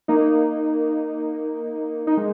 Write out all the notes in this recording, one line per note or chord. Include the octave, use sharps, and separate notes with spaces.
A#3 D#4
D#4
G#3